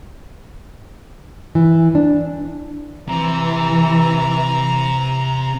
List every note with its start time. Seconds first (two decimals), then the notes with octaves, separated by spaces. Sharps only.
1.55 E3
1.95 D4
3.08 C3 E3 A#5